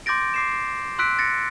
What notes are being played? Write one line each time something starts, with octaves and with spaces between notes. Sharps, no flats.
C6 D6 G6 A6 A#6 D7
D6 C7 E7
C6 E6 F#6 B6 D7
A6 A#6 C#7